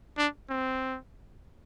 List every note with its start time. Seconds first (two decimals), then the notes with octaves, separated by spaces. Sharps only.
0.18 D4
0.50 C4